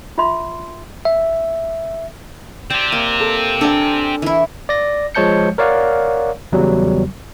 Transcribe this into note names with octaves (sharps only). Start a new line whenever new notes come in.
F4 E5 C6
E5
C4 G4 D5
A#3
A4
D4 A4 A#4 D5 G#5
E3 E4
D5 A#6
F3 G#3 C#5 A5 G6 C#7
A#4 C#5 D5 F5 F#5
E2 C#3 F#3 G3